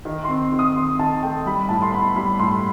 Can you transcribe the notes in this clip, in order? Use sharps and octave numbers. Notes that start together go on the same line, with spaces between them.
D#3
C4 C6
D#3
D#6
D#3 C6
D#3 A5
A3 G5
G3 B5
A2 A5
C6
B3 B5
G3 B5
A2 C6